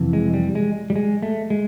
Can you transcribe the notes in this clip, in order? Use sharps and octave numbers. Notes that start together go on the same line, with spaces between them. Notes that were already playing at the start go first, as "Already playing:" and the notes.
Already playing: F2 C3 E3
G#3
G3
G#3
G3
G#3
A3
G#3